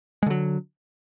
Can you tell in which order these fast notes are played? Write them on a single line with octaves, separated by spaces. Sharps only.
G#3 D3 F#3